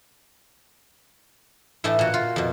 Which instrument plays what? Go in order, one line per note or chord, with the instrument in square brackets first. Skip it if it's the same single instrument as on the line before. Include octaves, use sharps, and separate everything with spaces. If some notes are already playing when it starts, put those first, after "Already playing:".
[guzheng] A2 E3 A3 D#5 A5
A#2 F#4
F4
F2 B2